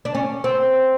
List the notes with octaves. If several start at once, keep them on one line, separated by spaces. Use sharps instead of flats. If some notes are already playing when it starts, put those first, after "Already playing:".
D4
C#4
C4